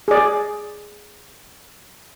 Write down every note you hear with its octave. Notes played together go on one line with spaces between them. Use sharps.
G#4 D5